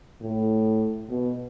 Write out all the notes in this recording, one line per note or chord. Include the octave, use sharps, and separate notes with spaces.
A2
B2